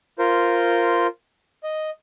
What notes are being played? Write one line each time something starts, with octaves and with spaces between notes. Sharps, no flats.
F4 A#4 C5
D#5